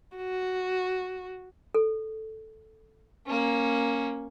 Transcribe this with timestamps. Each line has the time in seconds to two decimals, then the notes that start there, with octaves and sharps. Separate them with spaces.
0.17 F#4
1.74 A4
3.26 A#3 C#4